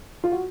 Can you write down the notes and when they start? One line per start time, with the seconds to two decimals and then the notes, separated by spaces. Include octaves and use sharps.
0.24 F4
0.32 F#4